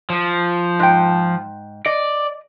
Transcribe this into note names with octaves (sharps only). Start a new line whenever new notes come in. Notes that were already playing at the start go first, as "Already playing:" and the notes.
F3
G#2 G5
D5 D#5